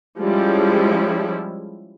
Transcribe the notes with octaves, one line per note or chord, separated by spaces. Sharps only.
F3 G3 G#3 C#4 E4